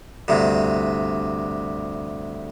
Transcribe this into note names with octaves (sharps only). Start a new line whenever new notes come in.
D2 G2 C3